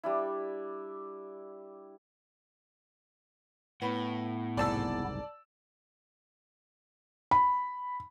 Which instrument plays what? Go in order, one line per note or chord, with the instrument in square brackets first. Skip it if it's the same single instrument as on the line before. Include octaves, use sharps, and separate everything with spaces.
[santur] G3 D4 E4
[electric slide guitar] A2 [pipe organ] B3 E4 [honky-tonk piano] B4
[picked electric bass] F#1 C2 G#2 [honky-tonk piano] D5 A5 E6
[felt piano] B5